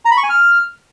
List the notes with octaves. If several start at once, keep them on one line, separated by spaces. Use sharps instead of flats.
A#5
B5
C#6
G#5
F6